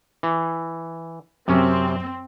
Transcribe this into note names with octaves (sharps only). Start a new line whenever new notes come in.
E3
F#2 C3 C4 C#4